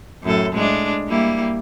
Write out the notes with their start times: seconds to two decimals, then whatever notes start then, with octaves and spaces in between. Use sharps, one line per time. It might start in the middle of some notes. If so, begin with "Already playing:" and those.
0.23 F#2 A2 A4
0.53 A2 G#3 D4
1.08 G3 A#3 E4